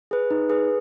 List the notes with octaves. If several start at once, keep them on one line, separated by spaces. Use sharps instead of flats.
G#4 B4
D#4
G#4 B4